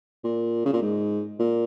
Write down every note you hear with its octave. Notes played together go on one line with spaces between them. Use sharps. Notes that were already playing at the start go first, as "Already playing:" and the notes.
A#2
C#3
A#2
G#2
A#2